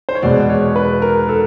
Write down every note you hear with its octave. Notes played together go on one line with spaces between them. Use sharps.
C5
C#5
E2 B2 G#3 B3 D5
C#5
B4
A#4
A4